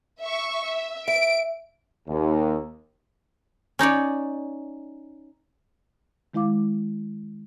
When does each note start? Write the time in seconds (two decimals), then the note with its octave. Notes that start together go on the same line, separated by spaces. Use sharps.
0.21 E5 C#6
0.64 E5
1.08 E5 D7
2.08 D#2
3.79 C#4 D#4 C#5 D5
6.34 D#3 G#3 E4 F5 D6